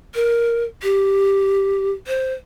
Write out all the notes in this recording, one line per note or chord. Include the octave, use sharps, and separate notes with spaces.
A#4
G4
C5